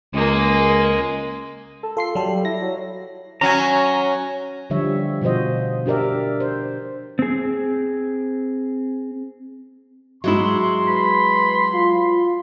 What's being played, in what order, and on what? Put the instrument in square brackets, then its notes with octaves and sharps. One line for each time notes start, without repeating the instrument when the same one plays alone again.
[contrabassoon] C#2 [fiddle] G#3 A#3
[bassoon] A4
[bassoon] F4 [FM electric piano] A4 C6 C7
[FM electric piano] F#3 A4 [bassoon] G3
[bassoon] E4 [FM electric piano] A#6
[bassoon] F#3
[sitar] F#3 C#4 [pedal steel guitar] G#5 A#5
[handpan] D3 F3 G3 C#5 E5
B2 F3 F#4 C5 D#5
D4 G4 A#4 D5 E5
C5
[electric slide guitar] C4 G#4
[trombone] G#2 [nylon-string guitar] F#3 G#3 E4 [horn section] C6
[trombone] B4 [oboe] B5
[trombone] F4